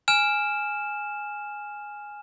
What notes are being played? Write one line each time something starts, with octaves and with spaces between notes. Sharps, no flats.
G#5 F6 E7